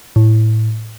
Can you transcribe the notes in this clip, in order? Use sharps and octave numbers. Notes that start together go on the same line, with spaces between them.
A2